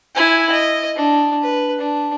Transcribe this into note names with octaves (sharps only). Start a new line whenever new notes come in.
E4 G#5
D#5
D4
B4
D4